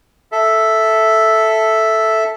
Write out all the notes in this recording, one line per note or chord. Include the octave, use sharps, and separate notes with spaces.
A4 E5